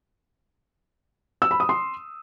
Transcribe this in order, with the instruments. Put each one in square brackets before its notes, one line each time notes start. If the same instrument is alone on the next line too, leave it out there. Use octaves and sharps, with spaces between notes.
[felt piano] E6
B5
D#6
C6